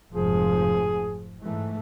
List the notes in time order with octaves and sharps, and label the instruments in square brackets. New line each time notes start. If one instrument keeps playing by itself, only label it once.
[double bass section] F1 G#2 F3 [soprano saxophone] G#4
[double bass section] G#2 E3 A3